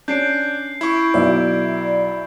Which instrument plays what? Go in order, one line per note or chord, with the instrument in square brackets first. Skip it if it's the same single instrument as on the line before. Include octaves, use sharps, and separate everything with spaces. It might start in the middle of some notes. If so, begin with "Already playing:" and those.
[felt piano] C#4 [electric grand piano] D4 [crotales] G6 C7 D7
[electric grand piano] E4 C#6
[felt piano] B1 [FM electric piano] D5 E5